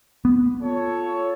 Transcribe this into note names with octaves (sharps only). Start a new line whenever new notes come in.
B3
F4 A4 C#5